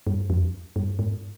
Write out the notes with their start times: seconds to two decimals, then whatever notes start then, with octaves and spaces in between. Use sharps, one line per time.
0.07 G2
0.30 F2
0.76 G2
0.99 G#2